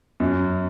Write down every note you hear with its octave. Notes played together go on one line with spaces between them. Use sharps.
F#2